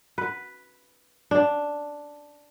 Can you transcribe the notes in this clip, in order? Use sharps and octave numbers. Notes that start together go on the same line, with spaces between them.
B4
D4